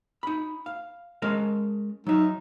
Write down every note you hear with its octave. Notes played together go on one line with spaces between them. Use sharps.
D#4 B5
F5
G#3 C#4 A#4
F#3 D#4 E5